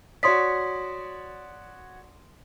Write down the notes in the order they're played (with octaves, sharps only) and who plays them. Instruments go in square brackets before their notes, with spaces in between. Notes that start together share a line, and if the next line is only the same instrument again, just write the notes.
[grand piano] F#4 C#5 D5 [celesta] C6 D#6 B6